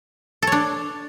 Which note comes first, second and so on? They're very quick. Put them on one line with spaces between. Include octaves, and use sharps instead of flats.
A4 C#5 D4